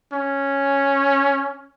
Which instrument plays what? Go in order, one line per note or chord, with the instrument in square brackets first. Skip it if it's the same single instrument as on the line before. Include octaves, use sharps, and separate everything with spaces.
[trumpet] C#4